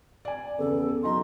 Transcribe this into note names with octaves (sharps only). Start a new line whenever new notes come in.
D5 G#5
E2 C#3 B3 A4
F#3 D#4 A#5 C6